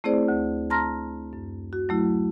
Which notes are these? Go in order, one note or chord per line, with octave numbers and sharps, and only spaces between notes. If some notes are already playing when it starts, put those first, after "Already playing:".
A3 C4 E4 G#4 C5 D5
D2
A5 A#5 C6 F6 A#6
F#2
F#4
F#3 A3 E4